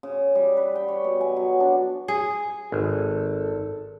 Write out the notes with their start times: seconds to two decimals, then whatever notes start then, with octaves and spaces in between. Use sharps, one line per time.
0.03 C#3
0.35 G3
0.57 B4
0.75 G5
0.88 C#5
1.04 B2
1.21 G#5
1.36 F#3
1.60 D4
2.08 G#4
2.72 G#1 A4